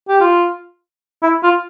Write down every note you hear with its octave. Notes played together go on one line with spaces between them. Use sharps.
G4
F4
E4
F4